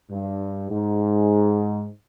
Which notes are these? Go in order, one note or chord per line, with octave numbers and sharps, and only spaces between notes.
G2
G#2